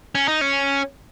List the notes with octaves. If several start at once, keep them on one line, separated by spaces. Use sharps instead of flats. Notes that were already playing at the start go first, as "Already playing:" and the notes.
C#4
D#4
C#4